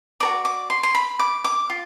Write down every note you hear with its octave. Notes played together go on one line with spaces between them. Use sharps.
F#4 A#4 D5 D6
D6
C6
C6
B5
D6
D6
F4